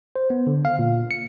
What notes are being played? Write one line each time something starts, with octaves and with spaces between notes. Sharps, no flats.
C5
B3
D3
F5
A#2
C#7